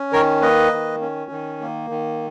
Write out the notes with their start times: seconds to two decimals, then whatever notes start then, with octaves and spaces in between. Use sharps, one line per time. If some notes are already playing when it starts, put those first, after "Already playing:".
Already playing: C#4
0.13 D#3 A#4 C#5
0.42 A#3 B4 D#5
0.72 D#3
1.01 C#4
1.31 D#3
1.61 A#3
1.90 D#3